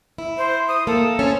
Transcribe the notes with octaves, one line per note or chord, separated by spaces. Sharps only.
E4
C5
D#6
A#3 A4
C#4 C5